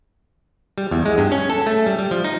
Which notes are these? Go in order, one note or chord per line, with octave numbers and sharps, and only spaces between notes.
G3
E2
G#3
G2
C#4
A4
A3
G3
G3
F3
D#4